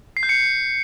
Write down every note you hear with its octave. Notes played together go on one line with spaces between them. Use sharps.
C7
G6
C#7